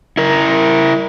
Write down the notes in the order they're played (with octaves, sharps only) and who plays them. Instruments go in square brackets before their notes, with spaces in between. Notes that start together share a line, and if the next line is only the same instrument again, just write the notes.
[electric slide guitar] E4 A#4